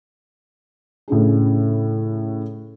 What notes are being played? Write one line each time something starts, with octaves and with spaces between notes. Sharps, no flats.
A2 C#3 D4 G#4